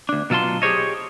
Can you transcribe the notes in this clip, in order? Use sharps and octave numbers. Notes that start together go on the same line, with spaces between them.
D2 D4
B2 F#3 F4 A5 C6
G4 G#4 C5 C#5 D#5